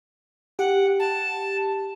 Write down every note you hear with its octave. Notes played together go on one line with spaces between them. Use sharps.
G4 F#5
A5